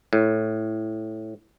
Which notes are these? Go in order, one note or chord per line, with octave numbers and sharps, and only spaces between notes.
A2